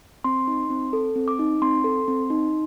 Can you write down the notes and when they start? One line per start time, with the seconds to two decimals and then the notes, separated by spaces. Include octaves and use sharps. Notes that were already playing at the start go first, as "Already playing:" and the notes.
0.24 C4 C6
0.48 D#4
0.70 C4
0.93 A4
1.16 C4
1.28 D6
1.39 D#4
1.62 C4 C6
1.84 A4
2.08 C4
2.30 D#4